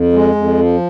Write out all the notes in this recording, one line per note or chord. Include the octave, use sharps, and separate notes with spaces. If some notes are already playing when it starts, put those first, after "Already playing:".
Already playing: F2
G#3
F2
F3